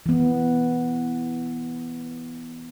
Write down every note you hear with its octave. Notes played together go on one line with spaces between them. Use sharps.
E3 B3